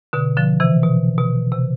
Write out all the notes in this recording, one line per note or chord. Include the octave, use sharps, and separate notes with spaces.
B2 D3
D3 F3
C3 E3
B2
B2
C3